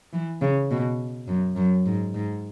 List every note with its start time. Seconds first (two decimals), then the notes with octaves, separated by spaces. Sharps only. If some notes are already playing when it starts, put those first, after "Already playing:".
0.13 E3
0.42 C#3
0.71 B2
1.28 F#2
1.56 F#2
1.86 G#2
2.14 G#2